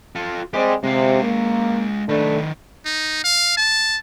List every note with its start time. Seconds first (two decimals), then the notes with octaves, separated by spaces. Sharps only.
0.16 F4 A4
0.54 G#3 C4 G4 D5
0.84 C3 G#3 F5
1.23 A#3
2.09 D#3 A3 D4 B4
2.85 D#4
3.24 F5
3.57 A5